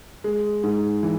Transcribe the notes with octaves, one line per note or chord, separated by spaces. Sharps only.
G#3
G#2
E3